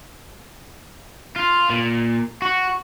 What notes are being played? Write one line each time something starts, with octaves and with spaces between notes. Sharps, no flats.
F4
A#2
F#4